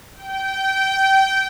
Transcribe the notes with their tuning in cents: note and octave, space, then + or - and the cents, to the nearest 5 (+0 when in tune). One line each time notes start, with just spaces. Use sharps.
G5 -20